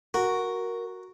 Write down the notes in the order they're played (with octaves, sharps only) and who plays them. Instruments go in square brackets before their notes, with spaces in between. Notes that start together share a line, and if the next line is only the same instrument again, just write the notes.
[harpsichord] F#4 [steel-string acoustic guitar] A#4